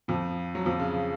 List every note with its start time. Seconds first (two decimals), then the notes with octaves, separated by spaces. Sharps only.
0.08 F2 F3
0.55 F#3
0.65 F2 F3
0.80 C#3
0.94 C#3